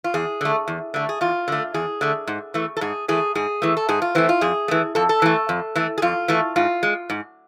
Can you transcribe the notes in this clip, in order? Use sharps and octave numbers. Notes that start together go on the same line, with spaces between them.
F4
E2 G#4
D3 A3
E2
D3 A3
G#4
E2 F4
D3 A3
E2 G#4
D3 A3
G#2
E3 A3
A4
G#2 G#4
E3 A3 G#4
G#2 G#4
E3 A3
A4
G#2 G#4
F4
E3 A3 C4
F4
F2 G#4
E3 A3
F2 A4
A4
E3 A3
F2
E3 A3
G#4
F2 F4
E3 A3
G#2 F4
G#3
G#2